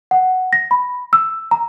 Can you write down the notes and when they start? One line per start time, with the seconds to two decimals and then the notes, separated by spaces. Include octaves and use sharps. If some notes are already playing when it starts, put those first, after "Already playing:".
0.11 F#5
0.53 A#6
0.71 B5
1.13 E6
1.51 A#5